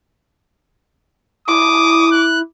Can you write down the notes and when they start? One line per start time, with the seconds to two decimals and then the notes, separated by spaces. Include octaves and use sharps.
1.48 E4 D6 D#6
2.12 F#6